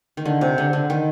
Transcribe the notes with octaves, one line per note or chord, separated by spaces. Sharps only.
D#3
D3
C3
D3
D3
D#3